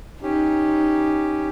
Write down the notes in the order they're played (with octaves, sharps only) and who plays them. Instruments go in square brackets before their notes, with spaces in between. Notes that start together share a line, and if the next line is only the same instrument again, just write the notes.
[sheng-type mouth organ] C#4 G4 [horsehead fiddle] D#4